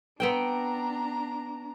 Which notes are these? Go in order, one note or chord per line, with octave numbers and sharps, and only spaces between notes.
B3 C4 D4 G5 A#5